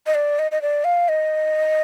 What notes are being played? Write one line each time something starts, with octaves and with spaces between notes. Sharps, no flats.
D#5
D5
D#5
D#5
D5
F5
D#5